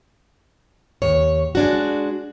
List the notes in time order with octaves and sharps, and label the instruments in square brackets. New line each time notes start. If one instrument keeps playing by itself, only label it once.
[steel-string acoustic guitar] D#2 C#5
G#3 D4 F#4